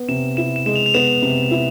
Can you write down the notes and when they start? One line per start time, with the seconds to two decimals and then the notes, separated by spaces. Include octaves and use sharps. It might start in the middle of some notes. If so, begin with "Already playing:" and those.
Already playing: B3
0.08 C3 E7
0.37 E4 E7
0.56 E7
0.66 G#3 E7
0.76 F7
0.86 F7
0.94 B3 E7
1.22 C3
1.51 E4